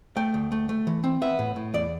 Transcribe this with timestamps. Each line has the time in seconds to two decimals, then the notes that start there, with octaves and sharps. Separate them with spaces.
0.16 A3 G5
0.34 D2
0.52 A3
0.69 A3
0.87 E3
1.04 C4
1.22 B3 E5
1.39 A2
1.56 A2
1.74 E2 D5